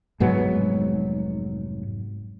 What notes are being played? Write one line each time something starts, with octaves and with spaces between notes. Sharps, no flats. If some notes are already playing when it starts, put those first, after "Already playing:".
F1 G#2 F#3 B3